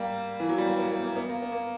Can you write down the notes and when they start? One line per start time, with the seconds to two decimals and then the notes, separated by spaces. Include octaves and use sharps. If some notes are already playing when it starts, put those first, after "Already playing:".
Already playing: G3 A#3
0.40 E3
0.49 F#3
0.58 G3
0.67 A#3
0.77 B3
0.90 A#3
1.03 A#3
1.16 B3
1.30 A#3
1.42 B3
1.52 A#3